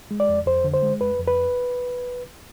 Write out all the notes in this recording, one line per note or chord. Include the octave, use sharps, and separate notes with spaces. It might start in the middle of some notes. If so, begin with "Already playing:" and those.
G#3
D5
F2
F2 C5
D3
C5
G#3
F2 B4
F2
B4